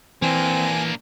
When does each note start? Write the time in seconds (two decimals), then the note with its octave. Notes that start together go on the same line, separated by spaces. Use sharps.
0.22 E3 A#3 C4 D4 G#5